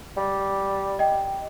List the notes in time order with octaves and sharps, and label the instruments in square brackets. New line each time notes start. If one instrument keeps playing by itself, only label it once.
[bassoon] G3
[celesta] D#5 G5